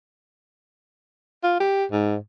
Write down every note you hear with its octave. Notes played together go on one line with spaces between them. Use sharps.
F4
G4
G#2